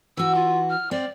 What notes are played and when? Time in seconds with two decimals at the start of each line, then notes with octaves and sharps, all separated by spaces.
0.17 E3 F#4 E6
0.35 F4
0.70 F6
0.91 C4 D5